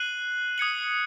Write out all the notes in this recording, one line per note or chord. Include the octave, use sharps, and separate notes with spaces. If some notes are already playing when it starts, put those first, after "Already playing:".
Already playing: F#6 C7 D#7 F#7
D#6 G#6 C#7 F#7